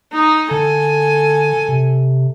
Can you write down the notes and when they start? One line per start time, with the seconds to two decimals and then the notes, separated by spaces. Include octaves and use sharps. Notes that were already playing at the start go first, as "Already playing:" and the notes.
0.13 D#4
0.51 D3 A4 G#5
1.69 C3